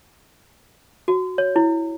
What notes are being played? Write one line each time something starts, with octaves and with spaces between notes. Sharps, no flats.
F#4
C#5
E4